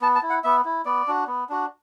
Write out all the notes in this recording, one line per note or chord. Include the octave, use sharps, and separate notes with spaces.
B3 A5
A5
E4
F#5
B3 E5
E4
B3 D5
D4 F#4
B3
D4 F#4